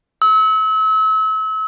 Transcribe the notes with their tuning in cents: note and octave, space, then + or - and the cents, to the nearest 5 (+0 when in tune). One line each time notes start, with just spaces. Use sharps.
E6 -35